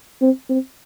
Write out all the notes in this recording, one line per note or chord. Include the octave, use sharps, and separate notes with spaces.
C4
C4